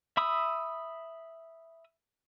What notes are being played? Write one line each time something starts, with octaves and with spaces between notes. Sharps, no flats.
E5 B5 D#6 E6